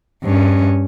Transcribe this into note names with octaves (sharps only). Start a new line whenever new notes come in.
G2 C#4